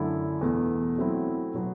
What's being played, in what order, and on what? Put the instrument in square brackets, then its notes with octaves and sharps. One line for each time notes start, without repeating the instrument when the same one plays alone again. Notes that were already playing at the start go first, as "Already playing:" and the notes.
Already playing: [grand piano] F#2 D3 A3 E4 A4
E2 B2 A3
F#3 A3 C4 E4
B2 F#3 B3